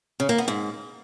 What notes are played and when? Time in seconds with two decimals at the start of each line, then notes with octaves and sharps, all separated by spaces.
0.20 C#3
0.29 A#3
0.38 B3
0.48 G#2